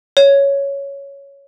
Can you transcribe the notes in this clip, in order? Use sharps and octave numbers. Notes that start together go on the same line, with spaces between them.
C#5